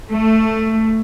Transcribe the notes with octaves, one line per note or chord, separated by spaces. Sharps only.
A3